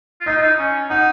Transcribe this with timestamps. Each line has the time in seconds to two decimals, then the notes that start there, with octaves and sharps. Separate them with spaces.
0.21 F4
0.26 D#4 D#5
0.37 F4
0.42 D#4
0.58 C#4
0.90 D#4 F#5